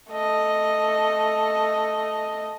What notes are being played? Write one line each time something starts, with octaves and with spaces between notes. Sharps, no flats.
A3 D#5